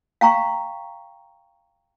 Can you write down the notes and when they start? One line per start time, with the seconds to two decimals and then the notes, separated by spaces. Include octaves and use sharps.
0.21 F5 G5 A#5 C#6